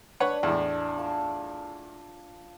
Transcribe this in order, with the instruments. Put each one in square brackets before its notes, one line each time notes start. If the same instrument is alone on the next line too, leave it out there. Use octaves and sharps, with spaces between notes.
[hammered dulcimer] D4 [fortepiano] B4 C#5 F#5
[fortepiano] E2 A2
[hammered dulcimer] F4 F5 A5